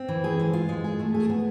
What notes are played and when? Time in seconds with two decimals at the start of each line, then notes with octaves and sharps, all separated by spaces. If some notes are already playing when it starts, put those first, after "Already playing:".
Already playing: C4
0.09 E3
0.24 G#4
0.39 G#3
0.53 F4
0.69 G#3
0.84 G#4
0.99 A3
1.14 G#4
1.29 B3